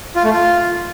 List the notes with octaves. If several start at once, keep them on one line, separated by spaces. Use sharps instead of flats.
F4
A3
F4